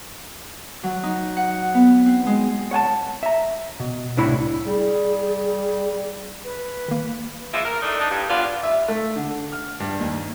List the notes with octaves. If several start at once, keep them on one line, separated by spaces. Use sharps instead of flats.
F#3
D#4
F#5
B3
C4
G#3
C#5 F#5 G#5 A5
E5 A#5
B2
C2 A2 D4 E4 C#5 B5
G3 G#4
B4
D#3 A#3
E3 F3 G#3 E4
A#4
E3 A3 D4 D#4
D4 D#4
G2
F3 B3 D4 F4
E5
A3
D3
F6
G2
D#2